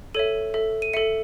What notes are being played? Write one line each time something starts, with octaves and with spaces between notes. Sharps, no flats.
A4 C#5 E5 D#7
A4 E5
D#7
A4 E5 C#7